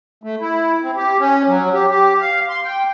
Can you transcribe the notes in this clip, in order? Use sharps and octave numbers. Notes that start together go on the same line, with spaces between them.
A3
E4
C4
G4
C#4
F#3
G4
G4
F5
C6
G5